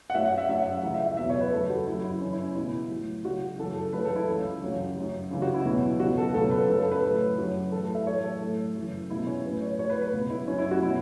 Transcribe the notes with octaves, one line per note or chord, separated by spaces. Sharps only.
F#5
F#2 F#3 E5
F#5
E5
F#2 F#3 E5
F#5
C#2 C#3 E3
E5
E5
E2 B2 F#3 E5
C#5
B4
F#2 C#3 F#3 A4
F#4
F#2 F#3 E4
E4
F#2 C#3 E3 C#4
E4
C#4
C#2 B2 F#3 E4
A2 F#3
C#2 C#3 F#3 F#4
F#2 C#3 E3 A4
A4
C#2 C#3 F#3 B4
A4
E4
C#2 C#3 E3
F#2 C#3 F#3
F#2 F#3
C#2 C#3 E3
F#4
E4
E2 B2 F#3
C#2 B2 F#3 F#4
A4
C#2 B2 F#3 A4
B4
F#2 C#3 F#3 A4
A4
B4
A2
F#3
F#2 F#3
A2 E3 A4
A4
E5
A2 F#3 C#5
A4
A2 F#3
F#2 C#3 E3
C#2 B2 F#3 E4
C#4
A2 F#3 B4
C#5
A2 F#3 C#5
B4
B4
C#2 B2 F#3
E4
F#2 F#3 C#4
E4
F#4
B2 F#3 E4